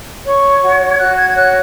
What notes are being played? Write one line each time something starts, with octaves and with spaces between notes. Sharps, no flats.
C#5 C#6
F#4
G#6
F#4 F#6
G#6
G#6
C#5 F#6